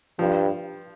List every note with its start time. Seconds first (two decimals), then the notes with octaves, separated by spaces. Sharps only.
0.19 G2 F3